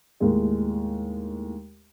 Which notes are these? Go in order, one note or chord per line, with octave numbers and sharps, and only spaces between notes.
D#2 A2 G#3